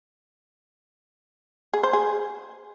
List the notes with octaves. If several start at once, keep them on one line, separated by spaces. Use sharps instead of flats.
G#4
C5
G#4